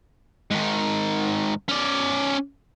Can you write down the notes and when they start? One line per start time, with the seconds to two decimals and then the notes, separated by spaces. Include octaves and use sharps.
0.51 G#2 D#3
1.69 C#4 D5